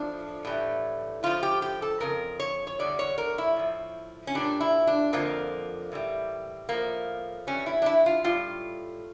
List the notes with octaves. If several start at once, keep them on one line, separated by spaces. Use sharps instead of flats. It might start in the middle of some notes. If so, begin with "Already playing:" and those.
Already playing: A2 F3 D4
A2 E3 G3
A2 F3 F4
G4
G4
A4
F2 C#3 A#4
C#5
C#5
E2 D3 G3 D5
C#5
A#4
E4
A2 F3
C#4
A#2 G3 D4
E4
D4
F2 D3 F3 A#3
A2 E3 G3
A2 F3 A#3
F2 E3 G3 C#4
E4
D4
E4
F4
A2 G3 F4